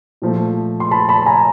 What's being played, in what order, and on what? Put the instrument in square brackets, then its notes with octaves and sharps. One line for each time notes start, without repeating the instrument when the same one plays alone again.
[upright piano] A#2 F3 A3
C6
A5 B5
A5 B5
G#5 A#5